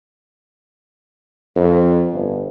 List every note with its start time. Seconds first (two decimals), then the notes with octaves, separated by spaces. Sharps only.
1.56 F2
2.14 G1